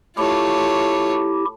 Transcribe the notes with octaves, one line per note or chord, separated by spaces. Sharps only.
A3 E4 F4 G4 C#5